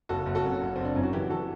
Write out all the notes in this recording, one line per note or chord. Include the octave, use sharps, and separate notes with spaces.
F#1 F#4 A4
F#1
F#4 A4
F#2
F#1
F#1 C4
D4
F#2 E4
F#4
E3 E4 G4
E3 F#4 A4